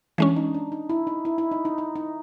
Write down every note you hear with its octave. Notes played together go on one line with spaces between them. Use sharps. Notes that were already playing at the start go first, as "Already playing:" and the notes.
E3 G#3 C#4 D4
D#4
D4
D#4
E4
D#4
E4
E4
D#4
D#4
D#4
D#4